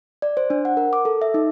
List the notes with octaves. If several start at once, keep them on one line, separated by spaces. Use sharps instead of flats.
D5
C5
D4
F#5
A#4
D6
A4
E5
D#4